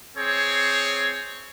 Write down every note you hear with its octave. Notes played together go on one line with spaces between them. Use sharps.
C4 G#4 C#5